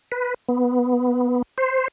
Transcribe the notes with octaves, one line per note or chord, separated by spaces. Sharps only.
B4
B3
C5